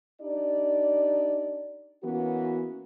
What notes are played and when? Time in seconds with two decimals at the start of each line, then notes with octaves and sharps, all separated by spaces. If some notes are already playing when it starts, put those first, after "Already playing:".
0.21 D4 D#4 G4 D5
2.03 E3 A#3 B3 C#4 F#4